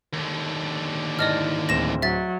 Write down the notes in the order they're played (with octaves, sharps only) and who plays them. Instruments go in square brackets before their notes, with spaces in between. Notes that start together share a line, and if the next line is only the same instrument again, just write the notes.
[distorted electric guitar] D#2 D3
[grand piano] G#2 A5 [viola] E4 [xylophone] D5 D#5 F6
[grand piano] D1 D2 C4 [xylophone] A#6 E7
[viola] F#3 [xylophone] E5 A6